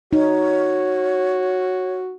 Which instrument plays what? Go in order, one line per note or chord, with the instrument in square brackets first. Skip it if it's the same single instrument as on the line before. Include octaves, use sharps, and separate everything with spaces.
[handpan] D#4 [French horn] F#4 [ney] C#5